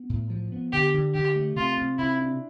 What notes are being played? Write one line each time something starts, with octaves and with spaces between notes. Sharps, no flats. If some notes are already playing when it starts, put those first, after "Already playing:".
Already playing: B3
A2
F3
B3
D3 G4
D3
D3 G4
A3
C3 F4
C3
C3 E4
D4